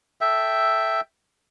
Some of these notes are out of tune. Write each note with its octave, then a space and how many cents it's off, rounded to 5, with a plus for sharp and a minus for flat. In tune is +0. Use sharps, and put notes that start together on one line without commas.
A4 +0 E5 +0 G5 +0